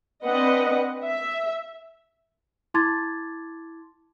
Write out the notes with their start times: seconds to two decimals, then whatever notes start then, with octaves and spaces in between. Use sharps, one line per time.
0.24 C4 D4 B4 D#5 F#5
1.04 E5
2.74 E4 A5 C6 D6 G#6 A6